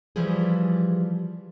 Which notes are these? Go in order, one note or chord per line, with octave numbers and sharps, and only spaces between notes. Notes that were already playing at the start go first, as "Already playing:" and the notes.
E3 F3 G3 G4 G#4